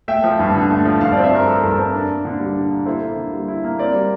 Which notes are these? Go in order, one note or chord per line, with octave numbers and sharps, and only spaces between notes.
A3 E5 G5
F3
G2
D3
A3
F3
G2 F5 A5
D5 F5
C4
C5 E5
G2 A#4
F3 A4
G2
A#4
C4
D4
A#3
D3
G3
D4
A#3
E4 A4 C5
A#3
D3
G3
E4
A#3
C4 A#4 D5
G3